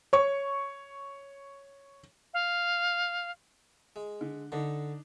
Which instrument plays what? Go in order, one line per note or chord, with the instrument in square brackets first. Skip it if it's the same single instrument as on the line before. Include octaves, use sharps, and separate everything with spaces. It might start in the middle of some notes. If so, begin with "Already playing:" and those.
[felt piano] C#5 C#6
[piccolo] F5
[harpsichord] G#3
[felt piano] D3
[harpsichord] D3 [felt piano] D4 D#4